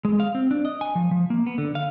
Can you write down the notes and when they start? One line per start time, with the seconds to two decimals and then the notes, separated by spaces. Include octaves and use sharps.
0.05 G#3
0.20 F5
0.35 C4
0.51 D4
0.65 D#5
0.81 G#5
0.95 F3
1.11 F3
1.30 A#3
1.47 B3
1.58 D3
1.75 F5